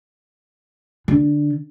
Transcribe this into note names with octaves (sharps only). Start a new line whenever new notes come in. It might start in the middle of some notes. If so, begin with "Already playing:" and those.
D3